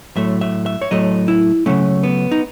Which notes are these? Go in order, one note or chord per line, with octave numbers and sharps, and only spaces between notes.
A2 F#3 A3 E5
E5
E5
C#5
A2 F#3 A3 D#5
E4
C#3 F#3 A3 C#4
B3
D#4